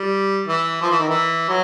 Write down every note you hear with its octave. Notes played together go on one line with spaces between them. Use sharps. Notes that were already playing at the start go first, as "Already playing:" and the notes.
Already playing: G3
E3
F3
E3
D#3
E3
F#3